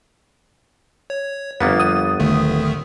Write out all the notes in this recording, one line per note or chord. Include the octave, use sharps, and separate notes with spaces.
C#5
G1 F2 A#3 B3 A6
D#6
D1 D3 D#3 A3